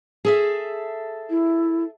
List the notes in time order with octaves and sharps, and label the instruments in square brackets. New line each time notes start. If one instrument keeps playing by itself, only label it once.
[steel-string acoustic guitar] G#4 A4 E5
[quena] E4